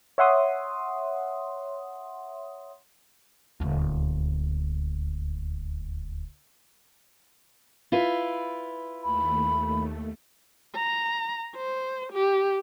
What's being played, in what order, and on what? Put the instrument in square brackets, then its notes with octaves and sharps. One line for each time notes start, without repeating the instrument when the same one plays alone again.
[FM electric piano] C#5 E5 F#5 C6 D#6
[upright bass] D#1 D2
[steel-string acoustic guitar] E4 F4 B4
[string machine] D#2 A3 [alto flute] B5
[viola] A#5
C5
G4